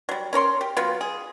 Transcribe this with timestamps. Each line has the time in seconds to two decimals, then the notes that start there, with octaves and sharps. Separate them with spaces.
0.09 F#3 G3
0.33 C#4 A#4 C#5 C6
0.61 G4
0.77 F#3 B3 F4
1.01 G#4